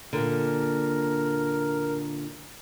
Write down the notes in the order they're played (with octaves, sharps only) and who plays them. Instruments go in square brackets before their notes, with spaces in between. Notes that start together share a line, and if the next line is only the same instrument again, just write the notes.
[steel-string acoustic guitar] A#2 D3 [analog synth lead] A#4